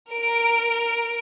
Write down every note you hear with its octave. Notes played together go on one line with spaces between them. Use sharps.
A#4 D7